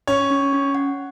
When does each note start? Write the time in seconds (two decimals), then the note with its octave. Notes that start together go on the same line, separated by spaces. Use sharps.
0.07 C#4 C#5
0.30 C#4
0.53 C#4
0.75 F#5